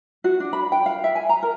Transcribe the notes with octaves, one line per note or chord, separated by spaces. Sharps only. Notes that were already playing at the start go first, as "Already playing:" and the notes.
F#4
D4
B5
G5
F5
E5
G#5
A#5
A#4